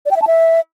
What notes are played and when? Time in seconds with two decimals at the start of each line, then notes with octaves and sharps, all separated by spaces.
0.06 D5
0.11 G5
0.16 E5
0.22 A5
0.27 E5